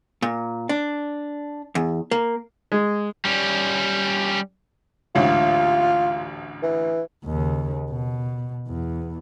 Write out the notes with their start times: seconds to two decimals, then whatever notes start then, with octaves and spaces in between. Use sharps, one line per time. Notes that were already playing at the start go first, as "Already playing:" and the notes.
0.22 A#2
0.69 D4
1.75 E2
2.11 A#3
2.72 G#3
3.25 G3 C#4
5.15 A1 D2 G#2 F4
6.63 E3
7.25 D#2 C#3
7.91 B2
8.68 E2